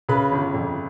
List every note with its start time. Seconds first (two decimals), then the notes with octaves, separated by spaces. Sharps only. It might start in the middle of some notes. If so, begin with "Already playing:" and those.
0.09 C#3 B4 B5
0.32 G1
0.54 F2